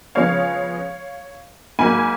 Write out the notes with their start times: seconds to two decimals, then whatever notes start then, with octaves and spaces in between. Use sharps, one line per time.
0.15 C#3 F3 G#3 B3 C#5 F5
1.79 G#2 F#3 A#3 G#5 B5